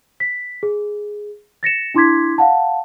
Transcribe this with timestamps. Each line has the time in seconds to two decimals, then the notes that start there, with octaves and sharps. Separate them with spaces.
0.20 B6
0.63 G#4
1.63 A6 A#6 C#7 E7
1.94 D4 E4 C6 D6 G#6 B6
2.38 F5 F#5 A5